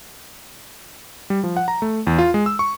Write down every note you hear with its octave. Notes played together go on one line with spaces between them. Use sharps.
G3
F3
F#5
A#5
A3
E2
F4
G#3
E6
C#6